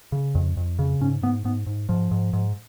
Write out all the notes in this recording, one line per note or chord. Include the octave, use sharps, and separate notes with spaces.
C#3
F2
F2
C#3
G#2 C#4
G#2 B3
G#2 B3
G#2
G#2 F3
G#2
G#2